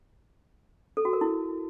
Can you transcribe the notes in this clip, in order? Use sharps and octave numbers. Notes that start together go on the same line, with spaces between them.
A4
F#4
A#4
E4